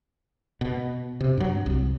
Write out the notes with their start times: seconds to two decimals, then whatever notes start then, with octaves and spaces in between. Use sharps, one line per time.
0.61 B2
1.21 C3
1.38 G2 F#3
1.66 C2